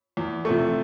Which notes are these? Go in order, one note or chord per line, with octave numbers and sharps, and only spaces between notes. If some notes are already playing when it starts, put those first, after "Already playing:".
E2
C3 F3 A3